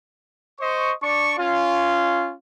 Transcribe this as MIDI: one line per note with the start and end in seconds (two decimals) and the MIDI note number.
0.60 0.93 72
0.60 0.93 75
0.60 0.93 85
1.02 1.37 62
1.02 1.37 74
1.02 1.37 85
1.38 2.33 61
1.38 2.33 65